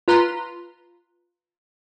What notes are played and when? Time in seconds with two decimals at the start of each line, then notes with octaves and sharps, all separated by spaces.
0.08 F4 B4 A#5 C6